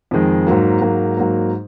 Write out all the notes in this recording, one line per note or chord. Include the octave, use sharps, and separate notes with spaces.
F2 D#3 G#3
G#2 F#3 A#3
G#2 F#3 A#3
G#2 F#3 A#3